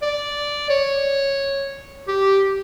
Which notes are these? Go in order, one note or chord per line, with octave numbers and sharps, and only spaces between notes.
D5
C#5
G4